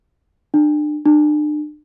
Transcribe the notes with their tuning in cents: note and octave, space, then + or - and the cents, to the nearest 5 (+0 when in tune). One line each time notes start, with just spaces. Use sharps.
D4 +35
D4 +40